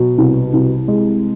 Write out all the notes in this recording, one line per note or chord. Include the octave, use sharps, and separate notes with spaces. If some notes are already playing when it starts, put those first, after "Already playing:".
Already playing: B2 F#3
C2
C2
G#3